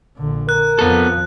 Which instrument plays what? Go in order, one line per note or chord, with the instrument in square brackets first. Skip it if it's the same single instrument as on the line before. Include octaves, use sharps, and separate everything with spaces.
[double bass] A#1 D3
[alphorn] A#4 [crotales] F#6
[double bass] F2 F3 [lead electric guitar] B3 A4